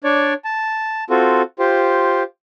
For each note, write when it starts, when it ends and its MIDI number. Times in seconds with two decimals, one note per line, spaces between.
0.04 0.34 62
0.04 0.34 73
0.04 0.34 74
0.44 1.04 81
1.10 1.42 60
1.10 1.42 65
1.10 1.42 66
1.10 1.42 69
1.59 2.23 65
1.59 2.23 67
1.59 2.23 72